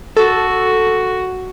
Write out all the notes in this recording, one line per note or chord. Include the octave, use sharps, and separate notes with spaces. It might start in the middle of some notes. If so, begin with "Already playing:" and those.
F#4 A4